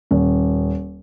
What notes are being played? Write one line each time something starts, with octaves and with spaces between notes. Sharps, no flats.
D#1